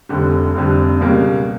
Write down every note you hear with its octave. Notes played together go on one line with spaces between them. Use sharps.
F1 F2 D3 G3
F1 F2 D3 G3
C#2 B2 G3 A#3